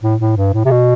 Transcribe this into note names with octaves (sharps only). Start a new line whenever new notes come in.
A2
A2
G2
A2
C3
B2